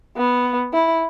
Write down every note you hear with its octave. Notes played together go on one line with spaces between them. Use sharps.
B3
E4